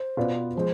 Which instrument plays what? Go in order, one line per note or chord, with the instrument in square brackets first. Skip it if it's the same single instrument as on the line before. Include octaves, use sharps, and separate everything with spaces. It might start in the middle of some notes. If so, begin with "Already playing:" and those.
Already playing: [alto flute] C5
[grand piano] B2 B3 F4 B4 D5
[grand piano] F3 G#3 [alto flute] C5